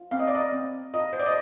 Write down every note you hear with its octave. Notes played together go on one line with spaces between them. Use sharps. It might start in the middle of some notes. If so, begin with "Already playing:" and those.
Already playing: F4
C4 F5
D#5
D5
D#5
C4
F4 D#5
C5
D5
D#5